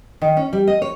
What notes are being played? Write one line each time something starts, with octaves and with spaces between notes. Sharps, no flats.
D#3
C#4
G3
D#5
C#5